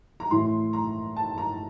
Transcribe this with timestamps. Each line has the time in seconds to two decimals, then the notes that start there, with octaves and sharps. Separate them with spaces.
0.20 A#5
0.31 A2 E3 C6
0.73 A#5
1.16 A5
1.38 A#5